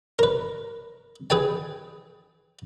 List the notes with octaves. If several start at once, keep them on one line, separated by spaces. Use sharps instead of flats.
A#4 B4
G#4 B4 G5 G#5